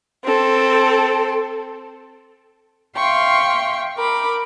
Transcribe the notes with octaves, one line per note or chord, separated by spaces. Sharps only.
C4 A4
E5 F5 G5 C6 C#6
A#4 B5 D6